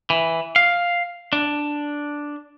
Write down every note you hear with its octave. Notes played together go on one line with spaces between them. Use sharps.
E3
F5
D4